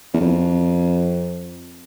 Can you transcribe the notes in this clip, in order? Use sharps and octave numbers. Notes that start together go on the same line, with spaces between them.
E2
F2